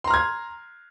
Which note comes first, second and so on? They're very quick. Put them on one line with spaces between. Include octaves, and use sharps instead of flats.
C6 A#5 F6 G#6